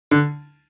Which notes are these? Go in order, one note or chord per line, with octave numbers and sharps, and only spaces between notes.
D3